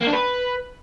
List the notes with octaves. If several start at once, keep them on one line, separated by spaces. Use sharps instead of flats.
A#3
D4
B4